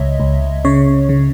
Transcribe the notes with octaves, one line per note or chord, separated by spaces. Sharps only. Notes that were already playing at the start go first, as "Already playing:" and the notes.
Already playing: C#2 C#5 D#5 E5
C#2
C#3 C#5
C#3